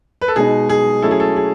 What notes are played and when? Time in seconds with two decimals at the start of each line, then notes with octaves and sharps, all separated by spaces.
0.21 B4
0.28 A4
0.36 B2 G#3 D#4 G#4
0.69 G#4
1.02 F#3 A3 C#4 E4 A4
1.11 G#4
1.20 A4
1.36 G#4